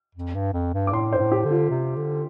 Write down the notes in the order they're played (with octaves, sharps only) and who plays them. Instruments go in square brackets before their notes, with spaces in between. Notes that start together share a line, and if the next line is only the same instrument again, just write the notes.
[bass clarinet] F2
G2
F2
G2
[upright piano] D6
[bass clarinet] A2 [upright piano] C6
[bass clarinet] G2 [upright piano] C5
[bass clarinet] A2
[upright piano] G4
[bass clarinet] D3
[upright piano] F4
[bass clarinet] C3
D3